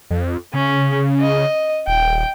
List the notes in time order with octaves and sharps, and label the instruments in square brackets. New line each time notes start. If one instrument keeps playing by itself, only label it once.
[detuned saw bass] F2
[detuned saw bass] C#3 [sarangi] C#4
[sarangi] D#5
[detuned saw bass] D#1 [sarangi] G5